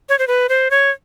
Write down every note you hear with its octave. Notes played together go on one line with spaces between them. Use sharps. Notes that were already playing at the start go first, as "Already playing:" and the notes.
C#5
C5
B4
C5
C#5